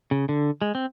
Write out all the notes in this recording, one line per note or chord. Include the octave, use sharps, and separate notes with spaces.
C#3
D3
G#3
C4